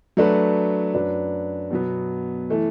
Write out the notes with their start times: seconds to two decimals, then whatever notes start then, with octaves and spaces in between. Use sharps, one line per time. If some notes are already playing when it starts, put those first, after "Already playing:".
0.17 F#3 A3 D4 F#4 B4
0.94 F#2 F#3 D4 B4
1.71 B2 F#3 B3
2.50 E3 A3